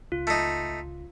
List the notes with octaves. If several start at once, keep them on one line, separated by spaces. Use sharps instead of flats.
C#2 F4
A3 D#4